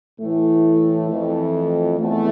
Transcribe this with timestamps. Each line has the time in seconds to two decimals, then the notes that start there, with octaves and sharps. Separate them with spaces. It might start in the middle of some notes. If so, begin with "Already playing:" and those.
0.20 A2 E3 A3
1.10 F2 E3
2.00 E2 A3